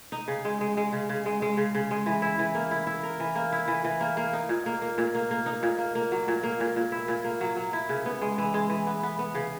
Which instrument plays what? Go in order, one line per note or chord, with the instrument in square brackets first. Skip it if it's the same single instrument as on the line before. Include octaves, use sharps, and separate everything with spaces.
[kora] D#4
C#3
G#3
G#3
G#3
C#3
C#3
G#3
G#3
C#3
C#3
G#3
E3
E4
E3
A#3
E4
E4
A#4
E3
A#3
E4
E3
E3
A#3
A#3
D#4
A#2
A#3
A#3
A#2
A#3
A#3
D#4
A#2
A#3
A#3
F#3
A#2
A#3
A#2
A#2
E4
A#2
A#3
F#3
F#3
E4
C#3
B3
G#3
E3
G#3
E3
B3
B3
B3
C#3